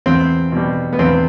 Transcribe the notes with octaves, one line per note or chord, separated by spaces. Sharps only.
E2 C4
B2 G3
B3
E2 C4